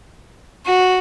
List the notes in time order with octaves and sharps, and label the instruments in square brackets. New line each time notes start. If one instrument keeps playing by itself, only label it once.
[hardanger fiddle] F#4